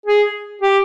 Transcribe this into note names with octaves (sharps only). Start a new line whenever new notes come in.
G#4
G4